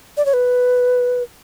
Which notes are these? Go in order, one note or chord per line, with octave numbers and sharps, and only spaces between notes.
D5
C#5
B4